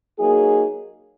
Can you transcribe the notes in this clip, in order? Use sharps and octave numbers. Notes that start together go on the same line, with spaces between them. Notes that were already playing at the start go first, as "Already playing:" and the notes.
F#3 A#3 D#4 G#4